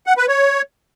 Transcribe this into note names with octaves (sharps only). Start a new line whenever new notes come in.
F#5
B4
C#5